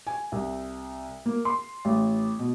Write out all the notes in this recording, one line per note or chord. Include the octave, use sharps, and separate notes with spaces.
G#5
C2
A#3
C6
A1
B2